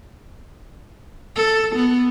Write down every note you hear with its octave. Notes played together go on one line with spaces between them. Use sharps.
A4
B3